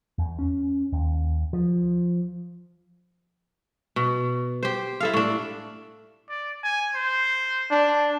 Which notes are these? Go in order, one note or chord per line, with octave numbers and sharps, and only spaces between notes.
E2
C#4
D#2
F3
B2
G4 C5
E4 A4 F5
A2 D4
D5
G#5
C5
D4